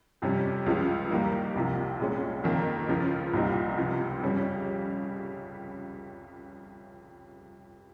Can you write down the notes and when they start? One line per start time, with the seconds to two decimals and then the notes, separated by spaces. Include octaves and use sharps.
0.22 F2 C3 G3 C#4
0.66 C#2 C#3 F3 G#3
1.11 D#2 D#3 G3 A#3 D#4
1.55 C2 C3 F3
2.00 C2 A#2 G#3 C#4
2.44 F2 D#3 A#3
2.89 C#2 C#3 F3
3.33 C2 A#2 G3 C4 D#4
3.77 C#2 C3 F3
4.22 F2 C#3 G3 C#4